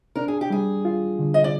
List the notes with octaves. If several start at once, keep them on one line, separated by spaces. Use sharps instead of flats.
D4 A#4
G#4
G4
G3 G#4
F4
D3
D#5
D5